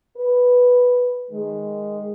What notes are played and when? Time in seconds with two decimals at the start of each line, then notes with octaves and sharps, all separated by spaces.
0.17 B4
1.31 D#3 G#3